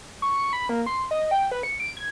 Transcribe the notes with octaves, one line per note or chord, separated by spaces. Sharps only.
C#6
B5
A#3
C6
D#5
G5
B4
C#7
D7
G#6